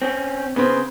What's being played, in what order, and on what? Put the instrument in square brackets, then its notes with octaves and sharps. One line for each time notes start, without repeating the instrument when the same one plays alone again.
[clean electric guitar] C4 C#4
[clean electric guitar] C#3 [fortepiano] B3 C4